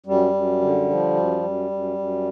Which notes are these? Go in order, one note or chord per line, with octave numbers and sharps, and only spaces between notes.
F#2 G3
F#2
D3
F3
F#2
F#2
F#2
F#2